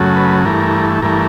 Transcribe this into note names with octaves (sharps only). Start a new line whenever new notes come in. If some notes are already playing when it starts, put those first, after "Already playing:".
Already playing: F#2 C#3 F#3 A3
B4
G2 E3 A3 A#4
G2 E3 A3 A#4